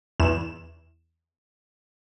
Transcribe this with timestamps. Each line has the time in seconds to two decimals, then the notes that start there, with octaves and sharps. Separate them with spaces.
0.20 E2 E7